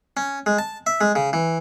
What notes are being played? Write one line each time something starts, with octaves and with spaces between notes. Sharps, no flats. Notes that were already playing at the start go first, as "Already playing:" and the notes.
C#4
G#3
A5
E5
G#3
C#3
E3